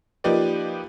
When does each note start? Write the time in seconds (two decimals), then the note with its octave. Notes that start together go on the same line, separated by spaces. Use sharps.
0.24 F3 A#3 D#4 G4 B4 D5